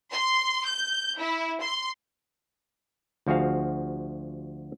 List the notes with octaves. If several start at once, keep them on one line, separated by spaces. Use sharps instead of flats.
C6
G6
E4
C6
D2 F3 F#4 G#4 F5